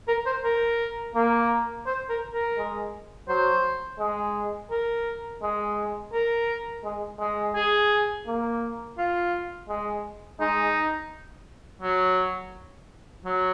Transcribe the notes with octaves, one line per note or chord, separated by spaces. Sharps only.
A#4
C5
A#4
A#3
C5
A#4
A#4
G#3
F#3 C5
G#3
A#4
G#3
A#4
G#3
G#3
G#4
A#3
F4
G#3
G#3 D#4
F#3
F#3